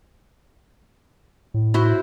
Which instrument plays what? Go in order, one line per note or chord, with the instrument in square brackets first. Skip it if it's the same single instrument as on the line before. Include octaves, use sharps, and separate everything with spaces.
[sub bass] A2
[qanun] E4 F#4 C5